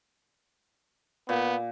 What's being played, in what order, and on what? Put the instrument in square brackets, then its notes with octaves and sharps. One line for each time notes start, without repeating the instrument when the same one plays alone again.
[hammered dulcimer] A#2 [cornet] B3